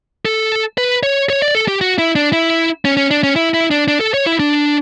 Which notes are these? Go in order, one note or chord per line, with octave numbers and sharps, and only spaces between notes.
A4
B4
C#5
C#5
D5
A4
G4
F#4
E4
D4
E4
C#4
C#4
D4
C#4
E4
E4
D4
D4
A4
C#5
E4
D4